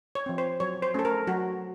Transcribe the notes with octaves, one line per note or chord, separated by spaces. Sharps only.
C#5
F3 C4
C5
F#3 C#5
C5
A3 C#4 A4
A#4
F#3 F#4